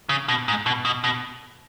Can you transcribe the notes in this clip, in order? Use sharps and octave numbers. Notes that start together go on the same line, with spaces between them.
C#3
B2
G#2
B2
B2
B2